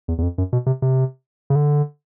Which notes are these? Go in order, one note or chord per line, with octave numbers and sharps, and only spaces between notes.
E2
E2
F2
F#2
B2
C3
C3
C#3
D3